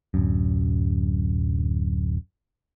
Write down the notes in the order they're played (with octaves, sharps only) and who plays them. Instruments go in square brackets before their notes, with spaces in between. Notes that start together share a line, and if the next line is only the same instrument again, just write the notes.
[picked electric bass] D1 F#2